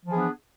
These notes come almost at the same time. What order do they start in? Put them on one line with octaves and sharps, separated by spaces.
F3 E3 G#4 B3 D4